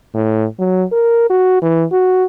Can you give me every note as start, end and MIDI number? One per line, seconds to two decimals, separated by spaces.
0.14 0.46 45
0.59 0.84 54
0.92 1.25 70
1.30 1.59 66
1.62 1.84 52
1.92 2.25 66